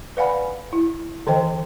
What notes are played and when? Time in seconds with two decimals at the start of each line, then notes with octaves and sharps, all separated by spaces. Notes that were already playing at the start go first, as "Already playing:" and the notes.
0.17 B4 D5 F5 F#5 G#5 B5
0.73 E4
1.27 D3 E3 C5 D#5 G5